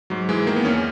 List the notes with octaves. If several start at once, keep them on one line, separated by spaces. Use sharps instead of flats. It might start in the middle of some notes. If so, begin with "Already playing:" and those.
G#2 F#3
E3 G#3
D#3 A#3
B3
E2 C#4